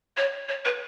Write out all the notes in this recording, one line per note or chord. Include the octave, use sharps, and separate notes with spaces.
C#5
C#5
B4